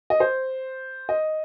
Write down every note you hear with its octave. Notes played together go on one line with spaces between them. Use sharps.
D#5
C5
D#5